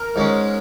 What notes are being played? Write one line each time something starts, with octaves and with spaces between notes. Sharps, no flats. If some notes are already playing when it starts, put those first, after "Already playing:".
Already playing: A#4
G#2 G#3 C#4